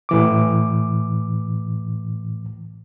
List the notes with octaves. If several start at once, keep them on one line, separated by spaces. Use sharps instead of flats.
A2 E3 D6